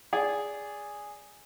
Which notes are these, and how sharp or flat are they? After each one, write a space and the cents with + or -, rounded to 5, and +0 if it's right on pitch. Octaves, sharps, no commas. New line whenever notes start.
G#4 -5 D5 -20